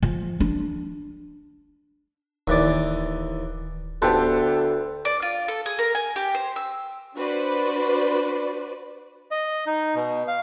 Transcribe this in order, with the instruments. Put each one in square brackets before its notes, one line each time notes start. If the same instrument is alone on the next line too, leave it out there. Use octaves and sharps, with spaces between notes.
[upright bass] F3
D4
[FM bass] D1 [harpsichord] D#2 E3 D5
[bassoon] D2 [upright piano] B3 G4 A4 [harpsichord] B4 C5
[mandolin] D5
F4
A4
G#4
A#4
G#5
G4
C5
E6
[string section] D4 F#4 B4 C5 D5
[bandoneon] D#5
D#4
B2
F5